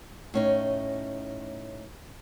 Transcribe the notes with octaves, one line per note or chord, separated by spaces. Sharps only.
A2 C#4 D#4